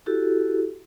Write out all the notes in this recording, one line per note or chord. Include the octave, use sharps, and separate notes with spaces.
E4 F#4 G4 A4